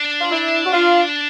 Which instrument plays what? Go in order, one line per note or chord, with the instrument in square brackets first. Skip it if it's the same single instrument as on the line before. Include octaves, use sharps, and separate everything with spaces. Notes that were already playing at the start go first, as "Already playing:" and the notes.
Already playing: [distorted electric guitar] D4
[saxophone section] F4
E4
F#4
F4